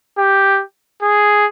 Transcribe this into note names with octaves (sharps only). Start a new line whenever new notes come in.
G4
G#4